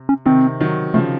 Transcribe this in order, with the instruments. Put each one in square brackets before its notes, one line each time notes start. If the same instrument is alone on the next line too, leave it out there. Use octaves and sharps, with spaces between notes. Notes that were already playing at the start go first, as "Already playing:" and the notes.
Already playing: [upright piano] C3
[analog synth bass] C#4
[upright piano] C3 D#3 [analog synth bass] C4
[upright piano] D#3 F#3
[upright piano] C#3 F3 [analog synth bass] A3